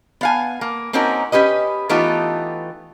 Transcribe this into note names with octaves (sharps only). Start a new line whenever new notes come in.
B3 F5 G#5
A#3
A#3 C4 C#4 D#4 F#4 A#4
C#4 G4 B4 D#5
E3 A3 B3 D#4 F4 G4